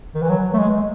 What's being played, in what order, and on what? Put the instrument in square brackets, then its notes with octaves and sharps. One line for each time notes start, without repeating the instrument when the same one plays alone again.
[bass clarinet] D#3
E3
F#3
A3
G#3